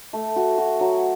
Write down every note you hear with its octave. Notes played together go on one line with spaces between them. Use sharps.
A3
F#4
F#4
F#3